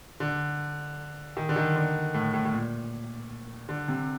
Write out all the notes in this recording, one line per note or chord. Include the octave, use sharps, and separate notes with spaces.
D3
D#3
D3
D#3
D3
A2
A2
A2
A#2
D3
C3